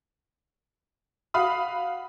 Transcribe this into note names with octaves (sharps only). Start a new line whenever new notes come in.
F#4 F5 B5 D#6